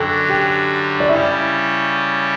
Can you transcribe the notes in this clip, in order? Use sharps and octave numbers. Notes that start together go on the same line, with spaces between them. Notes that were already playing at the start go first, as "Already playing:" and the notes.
Already playing: F#2 D3 F#3 A4 G5 A5
G4 G5
D5
C#3 G3 C#4 E4 E5